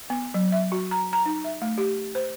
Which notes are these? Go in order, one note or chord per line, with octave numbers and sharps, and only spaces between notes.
B3
F#3
E5
F#4
A#5
A#5
D#4
E5
A3
G4
C5